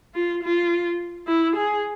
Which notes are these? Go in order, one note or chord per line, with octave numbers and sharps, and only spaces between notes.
F4
F4
E4
G#4